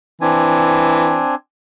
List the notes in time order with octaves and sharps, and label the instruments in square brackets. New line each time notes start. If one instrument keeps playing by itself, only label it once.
[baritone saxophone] E3 [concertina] C4 D4 G#5